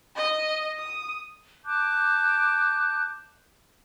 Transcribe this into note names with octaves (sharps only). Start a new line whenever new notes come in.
D#5
D#6
A5 D6 F#6 G6